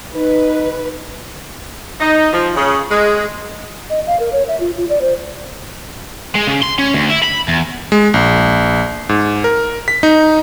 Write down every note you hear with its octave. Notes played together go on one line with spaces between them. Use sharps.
D#4 B4
D#4
F3
C#3
G#3
D#5
F5
A#4
C#5
E5
F4
F4
D5
C5
G#3
C#3
C6
C#4
D2
E4
B5
E2
G#3
A#1
G#2
A#4
B6
D#4